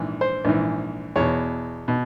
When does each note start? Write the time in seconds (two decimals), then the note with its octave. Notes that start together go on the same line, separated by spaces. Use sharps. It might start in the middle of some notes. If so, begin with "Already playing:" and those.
Already playing: A#1 G#2 E3
0.21 C5
0.45 A#1 G#2 E3
1.16 E2 B2 C#5
1.88 B2